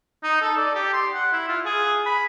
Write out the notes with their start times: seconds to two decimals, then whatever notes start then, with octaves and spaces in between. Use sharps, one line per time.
0.24 D#4
0.41 A4
0.57 D5
0.75 G4
0.93 C6
1.14 F#5
1.33 E4
1.48 F4
1.66 G#4
2.06 B5